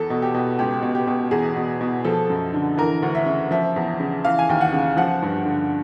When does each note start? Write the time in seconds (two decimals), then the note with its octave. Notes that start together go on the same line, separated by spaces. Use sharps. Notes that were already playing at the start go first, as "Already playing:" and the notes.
Already playing: E2 A4
0.10 B2
0.22 G4
0.34 B2
0.59 C#2 G4
0.83 B2
0.95 G4
1.07 B2
1.31 E2 G#4
1.56 B2
1.81 B2
2.05 F3 A4
2.30 F#2
2.53 D3
2.78 E3 A#4
3.02 D2
3.15 E5
3.26 C#3
3.51 F3 E5
3.76 E2
4.00 C#3
4.25 E3 F5
4.39 G#5
4.49 D#2 G5
4.61 F#5
4.73 C#3
4.97 F3 F#5
5.22 G2
5.45 D3